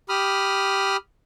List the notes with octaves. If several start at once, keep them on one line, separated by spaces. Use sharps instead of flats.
G4 B5 D#6 F6